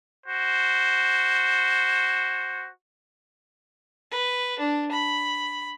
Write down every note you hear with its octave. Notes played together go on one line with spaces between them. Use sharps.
F#4 C5
B4
D4
B5